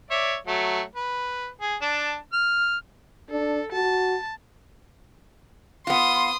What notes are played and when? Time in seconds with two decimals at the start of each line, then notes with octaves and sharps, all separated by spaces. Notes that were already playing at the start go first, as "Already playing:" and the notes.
0.11 C#5 D5 E5
0.47 F#3 A3
0.95 B4
1.61 G#4
1.81 D4 A5
2.33 F6
3.30 D4 A4
3.72 F#4 A5
5.87 B3 F4 C6 D#6